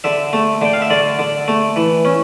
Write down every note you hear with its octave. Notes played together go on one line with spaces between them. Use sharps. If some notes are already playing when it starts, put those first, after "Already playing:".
D3 E5
A3
D3 G5
F5
E5
D3 D5
D3
A3
E3
C#4